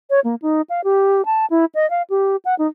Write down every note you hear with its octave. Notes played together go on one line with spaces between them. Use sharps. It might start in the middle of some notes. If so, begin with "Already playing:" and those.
C#5
A#3
D#4
F5
G4
A5
E4
D#5
F5
G4
F#5
D#4